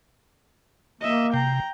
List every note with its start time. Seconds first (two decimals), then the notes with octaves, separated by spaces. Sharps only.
1.01 A#3 D#5 E5
1.34 C3 G5 A#5